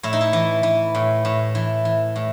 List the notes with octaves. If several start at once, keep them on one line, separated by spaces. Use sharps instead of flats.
A2 E4
D#4
E4
E3
E3
A2
A2
E3
E3
A2